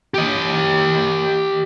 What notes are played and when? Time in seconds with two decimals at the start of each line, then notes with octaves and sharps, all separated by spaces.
0.14 G4 D#5